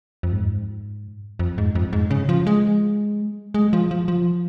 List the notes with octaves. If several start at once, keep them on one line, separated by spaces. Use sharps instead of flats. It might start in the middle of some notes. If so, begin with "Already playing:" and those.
F2
G#2
F2
G#2
F2
G#2
C#3
F3
G#3
G#3
F3
F3
F3